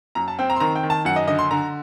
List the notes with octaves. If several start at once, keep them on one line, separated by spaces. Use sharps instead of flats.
F#2 A#5
A5
C4 G5
A#5
C6
D#3 A#5
G5
D#3
A5
F#2 F#5
D#5
D3 D#5
C6
D3 A#5